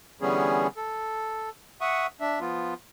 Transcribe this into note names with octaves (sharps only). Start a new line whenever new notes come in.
D3 E3 G3 B3 C#4 G#4
A4
E5 F#5 C#6 D#6
D4 E5
F3 B3 F4